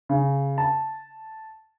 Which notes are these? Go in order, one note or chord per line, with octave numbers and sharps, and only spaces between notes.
C#3
A5